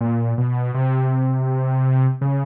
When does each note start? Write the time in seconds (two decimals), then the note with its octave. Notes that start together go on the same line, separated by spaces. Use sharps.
0.01 A#2
0.38 B2
0.74 C3
2.21 C#3